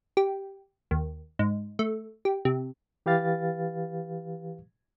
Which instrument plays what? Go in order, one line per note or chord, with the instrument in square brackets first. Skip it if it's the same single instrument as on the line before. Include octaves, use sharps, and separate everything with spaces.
[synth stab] G4
D#2
G#2
A3
G4
C3
[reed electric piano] E3 G4 B4 F5 A6